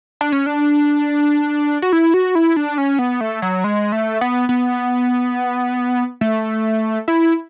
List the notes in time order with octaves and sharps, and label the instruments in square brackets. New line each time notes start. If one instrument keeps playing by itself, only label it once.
[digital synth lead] D4
C#4
D4
F#4
E4
F#4
E4
D4
C#4
B3
A3
F#3
G#3
A3
B3
B3
A3
E4